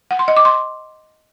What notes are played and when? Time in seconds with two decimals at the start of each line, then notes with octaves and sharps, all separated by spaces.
0.11 F#5
0.19 C6
0.28 D#5
0.37 D6
0.45 C6